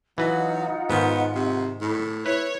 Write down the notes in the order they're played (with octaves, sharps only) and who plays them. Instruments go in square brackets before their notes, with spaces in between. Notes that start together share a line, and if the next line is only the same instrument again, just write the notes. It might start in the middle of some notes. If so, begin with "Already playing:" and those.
[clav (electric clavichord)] E3 B4 [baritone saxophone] F#3 [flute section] D#4 F4 F#5
[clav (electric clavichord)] G#2 D#3 [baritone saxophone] B3
[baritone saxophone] C3
A2
[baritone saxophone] E4 [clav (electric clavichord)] B4 [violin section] C#5